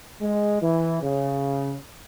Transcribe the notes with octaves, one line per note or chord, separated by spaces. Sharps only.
G#3
E3
C#3